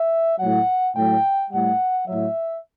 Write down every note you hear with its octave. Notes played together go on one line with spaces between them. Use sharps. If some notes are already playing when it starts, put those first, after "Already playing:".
Already playing: E5
A2 F#3 F#5
A2 F#3 G5
A2 G3 F#5
A2 F#3 E5